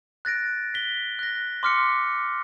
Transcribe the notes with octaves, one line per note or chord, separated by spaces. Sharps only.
F#6 A6 A#6 D7
B6 G7
F#6 A#6
C6 D6 F6 B6 C#7